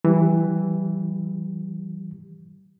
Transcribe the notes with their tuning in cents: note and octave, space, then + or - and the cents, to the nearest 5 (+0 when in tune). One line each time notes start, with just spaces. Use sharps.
E3 +0 G3 -40 G4 +5